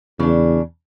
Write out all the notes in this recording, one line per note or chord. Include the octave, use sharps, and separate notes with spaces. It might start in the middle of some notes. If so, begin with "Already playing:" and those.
E2 C#3 D4